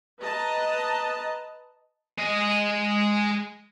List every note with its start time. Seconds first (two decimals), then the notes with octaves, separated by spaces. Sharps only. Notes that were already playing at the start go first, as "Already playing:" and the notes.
0.22 B4 D#5 A5 A#5
2.18 G#3 D#5